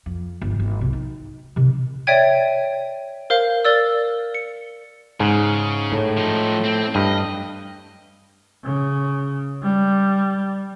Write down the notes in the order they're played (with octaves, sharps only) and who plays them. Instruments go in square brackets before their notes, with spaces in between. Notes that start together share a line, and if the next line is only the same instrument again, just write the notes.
[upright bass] F2
G1
G#1
B1 C3
D#4
C3 D#3
[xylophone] C#5 D5 E5 G5 G#6 D#7
A#4 C5 F5
A#4 D5 E6
C#7
[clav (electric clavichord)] G#2 [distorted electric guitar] C#3
[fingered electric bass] A2
[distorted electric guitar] F3 D#4
C4
[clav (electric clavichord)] G2 [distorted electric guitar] D#5
[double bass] C#3
G3